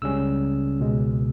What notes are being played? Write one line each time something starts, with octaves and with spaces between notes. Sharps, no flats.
C#2 C#3 G3 C#4 E6
C#2 B2 G#3